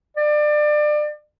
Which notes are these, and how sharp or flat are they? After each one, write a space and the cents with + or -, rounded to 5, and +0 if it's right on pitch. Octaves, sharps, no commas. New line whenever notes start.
D5 +30